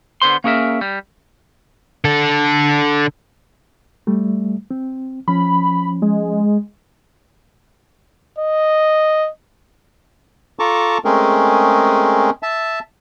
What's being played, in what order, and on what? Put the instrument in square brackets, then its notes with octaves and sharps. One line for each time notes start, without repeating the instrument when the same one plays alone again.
[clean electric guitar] D3 B3 C5 C6
A#3 C#4 G#4 A#4 E5
G3
[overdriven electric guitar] D3 A4
[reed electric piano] G3 A3
C4
[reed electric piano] F3 C#4 [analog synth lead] B5
[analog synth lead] G#3
[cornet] D#5
[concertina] F4 A4 A5 A#5 C#6 D6
G#3 A3 C4 C#4 G#4 A#4
E5 A5